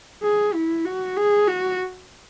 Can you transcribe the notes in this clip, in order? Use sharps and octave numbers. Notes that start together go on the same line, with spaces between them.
G#4
E4
F#4
G#4
F#4